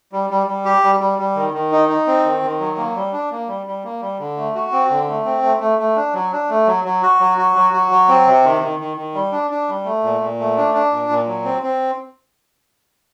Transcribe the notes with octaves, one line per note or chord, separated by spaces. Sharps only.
G3
G3
G3
G4
G3
G3
G3
D#3
D#3
D#4
D#4
C4
D#3
D#3
F#3
A#3
G3
D4
A#3
G3
G3
A#3
G3
D3
A3
F#4
C4
D3
A3
C4
A3
A3
A3
D4
F#3
D4
A3
F#3
F#3
F#4
F#3
F#4
F#3
F#4
F#3
C4
C3
D#3
D#3
D#3
D#3
G3
D4
D4
G3
A3
A#2
A#2
A3
D4
D4
A#2
A#2
F#3
C4
C4